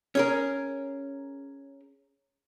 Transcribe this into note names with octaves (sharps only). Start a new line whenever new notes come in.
C#4 G#4 A#4